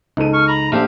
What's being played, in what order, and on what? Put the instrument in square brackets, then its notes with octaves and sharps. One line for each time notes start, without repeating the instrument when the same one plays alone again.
[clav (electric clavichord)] C#2 [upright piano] D#4 A4 D#7
[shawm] C#6 [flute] F6
[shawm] A#5 [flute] B5
[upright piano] A#1 [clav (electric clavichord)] A3 C4 D4 [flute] G4 [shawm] F5